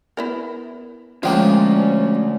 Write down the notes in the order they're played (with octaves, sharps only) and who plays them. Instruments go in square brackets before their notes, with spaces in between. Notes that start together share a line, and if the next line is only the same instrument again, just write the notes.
[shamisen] B3 E4 A#4
[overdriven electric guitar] D2 [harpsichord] F3 G#3 A#3 [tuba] C#4 [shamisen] F5 G5